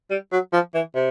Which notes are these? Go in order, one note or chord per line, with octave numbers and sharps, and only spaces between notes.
G3
F#3
F3
E3
C3